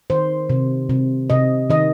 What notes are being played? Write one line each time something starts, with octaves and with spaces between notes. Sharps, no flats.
D#3 C5
C3
C3
C3 D#5
D#3 D#5